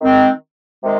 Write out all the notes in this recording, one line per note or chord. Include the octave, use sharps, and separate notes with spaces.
D#3 G#3 C4
C3 D#3 G#3